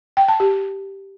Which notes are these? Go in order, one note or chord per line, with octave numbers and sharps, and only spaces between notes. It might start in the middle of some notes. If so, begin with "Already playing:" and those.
G5
A5
G4